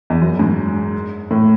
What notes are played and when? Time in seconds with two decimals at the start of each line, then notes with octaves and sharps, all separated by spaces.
0.10 E2
0.22 F#2
0.39 G#2
1.31 A2